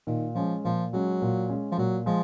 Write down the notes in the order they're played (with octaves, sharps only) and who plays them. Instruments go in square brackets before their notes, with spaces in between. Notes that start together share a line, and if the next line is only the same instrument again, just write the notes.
[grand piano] A#2 [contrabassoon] D#3
[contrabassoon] F3 [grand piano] G#3 C#4
[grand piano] A#2 [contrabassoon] F3
[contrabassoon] F#3 [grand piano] G#3 C#4
[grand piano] A#2
G#3 C#4
[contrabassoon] F3
[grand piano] A#2 [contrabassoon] F#3
[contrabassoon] F3 [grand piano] G#3